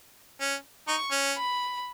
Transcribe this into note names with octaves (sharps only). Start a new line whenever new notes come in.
C#4
D#4 C#6
C#4
B5